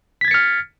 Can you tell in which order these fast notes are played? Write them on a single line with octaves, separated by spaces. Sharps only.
B6 G#6 A6 C#7 F6